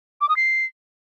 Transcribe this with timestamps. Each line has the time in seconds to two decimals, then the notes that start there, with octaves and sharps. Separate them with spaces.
0.21 D6
0.29 D#6
0.37 C7